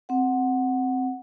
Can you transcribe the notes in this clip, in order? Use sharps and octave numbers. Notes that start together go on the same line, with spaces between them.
C4 F#5